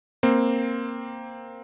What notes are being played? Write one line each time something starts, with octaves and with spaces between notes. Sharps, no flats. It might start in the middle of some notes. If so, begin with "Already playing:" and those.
A#3 C4